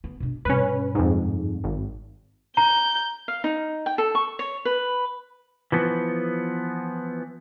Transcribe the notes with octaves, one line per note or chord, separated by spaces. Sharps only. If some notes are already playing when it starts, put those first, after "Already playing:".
B3
B2 D4
G2 B2 C#4 B4
F2 G#2
G#1
A#5 G6
F5
D#4
G5
A4
C#6
C#5
B4
E3 F3 B3